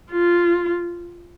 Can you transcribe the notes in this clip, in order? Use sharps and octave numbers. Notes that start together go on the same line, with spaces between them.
F4